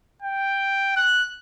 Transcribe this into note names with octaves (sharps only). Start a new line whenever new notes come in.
G5
F#6